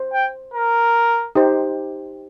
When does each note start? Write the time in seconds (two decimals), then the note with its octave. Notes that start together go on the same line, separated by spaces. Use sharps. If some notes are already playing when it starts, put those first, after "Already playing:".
Already playing: C5
0.14 G5
0.54 A#4
1.35 D#4 G4 C5